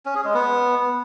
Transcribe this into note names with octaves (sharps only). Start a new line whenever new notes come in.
C#4
G#4
G#3
B3